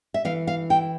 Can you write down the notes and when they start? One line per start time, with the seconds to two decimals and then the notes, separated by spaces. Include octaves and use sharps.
0.14 E5
0.25 E3 F5
0.47 F5
0.70 E4 G5